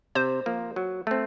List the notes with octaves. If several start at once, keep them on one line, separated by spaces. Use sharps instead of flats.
C3 C5
F3 A#3
F#3
A3 C4